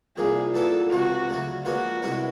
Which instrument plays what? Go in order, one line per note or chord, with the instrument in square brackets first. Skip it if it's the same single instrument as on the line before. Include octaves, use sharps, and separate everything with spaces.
[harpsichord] C2 A#2 F3 [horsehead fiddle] G#4
[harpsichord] A#2 F#3 B3 E4 [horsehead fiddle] A4
[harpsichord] C#2 C3 F3 [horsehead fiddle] F#4
[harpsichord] D2 C#3 F#3
[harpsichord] A#2 F3 G#3 B3 [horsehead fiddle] F#4
[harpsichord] C2 B2 G#3 C#4 E4